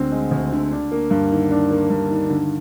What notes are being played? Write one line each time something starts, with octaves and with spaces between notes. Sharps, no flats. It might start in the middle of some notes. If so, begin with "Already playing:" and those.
Already playing: D2 D3 G#3 C4
G#3
D2
D3
D4
A#3
G2
D#3
D4
A#3
G2
D#3
D3